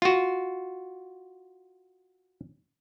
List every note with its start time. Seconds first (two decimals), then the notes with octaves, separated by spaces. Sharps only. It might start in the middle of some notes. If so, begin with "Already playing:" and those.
0.02 F4 F#4